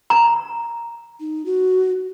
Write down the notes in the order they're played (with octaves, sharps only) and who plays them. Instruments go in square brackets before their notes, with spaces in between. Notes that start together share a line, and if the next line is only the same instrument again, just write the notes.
[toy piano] A#5
[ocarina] D#4
F#4